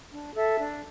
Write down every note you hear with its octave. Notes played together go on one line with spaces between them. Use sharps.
D4
A4 E5 A5
D4